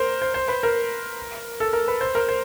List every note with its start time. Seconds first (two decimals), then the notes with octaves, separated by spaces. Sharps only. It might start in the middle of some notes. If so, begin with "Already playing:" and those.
Already playing: A#4 C5
0.22 C5
0.34 C5
0.48 B4
0.63 A#4
1.60 A4
1.73 A#4
1.88 B4
2.01 C5
2.15 A#4
2.29 C5